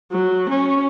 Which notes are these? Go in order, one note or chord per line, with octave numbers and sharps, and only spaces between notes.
F#3
C#4